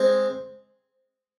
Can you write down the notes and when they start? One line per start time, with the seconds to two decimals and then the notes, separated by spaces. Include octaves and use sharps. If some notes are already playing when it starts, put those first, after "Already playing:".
Already playing: G#3 C4